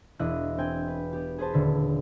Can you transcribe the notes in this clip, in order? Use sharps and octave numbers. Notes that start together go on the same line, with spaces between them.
E1 D4 E4 D#5 F#6
C4 G5 G#5
B4
B3 G4
G#4 B4 C5 A5
D#1 D3 B6